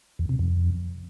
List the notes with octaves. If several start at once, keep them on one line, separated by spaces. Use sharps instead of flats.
E2
C3
F2